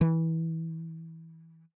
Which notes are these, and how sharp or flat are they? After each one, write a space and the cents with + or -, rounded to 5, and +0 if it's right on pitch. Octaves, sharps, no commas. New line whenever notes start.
E3 -20